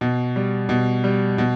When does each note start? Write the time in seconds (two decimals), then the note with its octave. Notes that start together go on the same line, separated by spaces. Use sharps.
0.01 B2
0.36 G3
0.69 B2
1.04 G3
1.38 B2